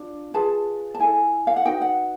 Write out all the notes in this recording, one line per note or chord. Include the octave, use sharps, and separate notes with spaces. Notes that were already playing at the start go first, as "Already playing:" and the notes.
Already playing: D4 F4
F4 G#4 B4 A5
A5
E4 A4 G#5
F5
F#5
D#4 F#4 B4 G5
F#5